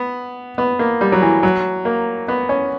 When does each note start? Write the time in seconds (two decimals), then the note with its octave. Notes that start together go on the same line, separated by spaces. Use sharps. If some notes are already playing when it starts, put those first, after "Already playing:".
Already playing: B3
0.58 B3
0.79 A#3
1.01 G3
1.12 F#3
1.22 E3
1.43 F#3
1.85 A#3
2.28 B3
2.49 C#4